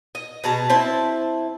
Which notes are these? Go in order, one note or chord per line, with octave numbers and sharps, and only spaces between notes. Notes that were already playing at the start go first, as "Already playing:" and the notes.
D#5
B2 G#4 A5 A#5
C4 E4 A5